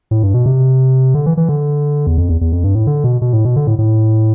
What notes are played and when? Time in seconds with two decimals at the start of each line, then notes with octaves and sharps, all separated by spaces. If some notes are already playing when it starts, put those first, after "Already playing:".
0.11 A2
0.23 G2
0.34 B2
0.46 C3
1.14 D3
1.26 E3
1.37 E3
1.49 D3
2.07 E2
2.18 F2
2.29 E2
2.41 E2
2.52 F2
2.64 G2
2.75 A2
2.87 D3
3.04 B2
3.22 B2
3.33 A2
3.45 B2
3.56 D3
3.67 A2
3.79 A2